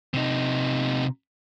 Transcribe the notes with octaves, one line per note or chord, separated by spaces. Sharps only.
C3 D#4